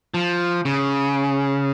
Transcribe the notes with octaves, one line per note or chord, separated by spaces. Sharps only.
F3
C#3